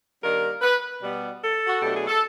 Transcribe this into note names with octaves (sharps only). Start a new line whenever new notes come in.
D#3 G3 A#3 D4 A#4
B4
B2 G3 B3
A4
F#4
B2 F#3 A3 D4 G4
G#4
A4